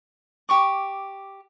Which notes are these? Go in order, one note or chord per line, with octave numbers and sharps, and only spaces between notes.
G4 C#6 D6